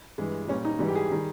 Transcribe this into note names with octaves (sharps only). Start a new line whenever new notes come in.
G2 E3 G#3
A#2 G3 C#4
D#4
G#2 E3 G3
G4
G#4
D#3 G3